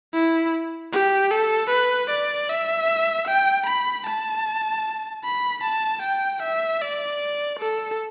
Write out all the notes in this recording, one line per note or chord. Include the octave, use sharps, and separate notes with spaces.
E4
G4
A4
B4
D5
E5
G5
B5
A5
B5
A5
G5
E5
D5
A4